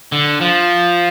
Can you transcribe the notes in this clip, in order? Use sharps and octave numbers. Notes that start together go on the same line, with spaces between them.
D3
F3